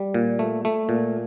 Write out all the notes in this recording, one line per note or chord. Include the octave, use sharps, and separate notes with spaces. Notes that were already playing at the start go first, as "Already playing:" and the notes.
Already playing: G3
A#2
A3
A3
A#2